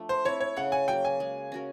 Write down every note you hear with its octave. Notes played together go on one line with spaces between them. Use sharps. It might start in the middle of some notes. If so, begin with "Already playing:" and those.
Already playing: F3 A3 D4
C5
C4 E4 C#5
C#5
C#3 F#5
G#5
F#3 A#3 G5
G#5
G#3
C#4 F#4 A#4